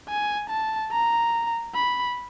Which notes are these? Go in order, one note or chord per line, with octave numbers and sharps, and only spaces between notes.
G#5
A5
A#5
B5